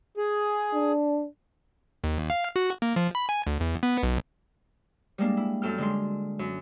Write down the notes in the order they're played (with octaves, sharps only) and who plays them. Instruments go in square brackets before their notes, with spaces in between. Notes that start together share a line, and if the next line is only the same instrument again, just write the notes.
[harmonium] G#4
[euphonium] D4
[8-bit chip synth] D#2
F5
F#4
A#3
F3
B5
G#5
D2
E2
B3
B1
[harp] G3 G#3 A#3 D4
E4
F#2 A4 G5 F6
D3 G#3 C6
F#2